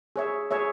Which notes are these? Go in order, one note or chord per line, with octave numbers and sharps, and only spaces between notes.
G#4 C#5 E5
G#4 C#5 E5